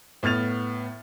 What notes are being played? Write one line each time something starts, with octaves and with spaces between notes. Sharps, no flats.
A2 B3 F6 A6 F7